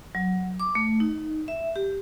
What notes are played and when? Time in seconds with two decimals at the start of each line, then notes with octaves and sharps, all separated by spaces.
0.15 F#3
0.60 D6
0.75 A3
1.00 D#4
1.48 E5
1.76 G4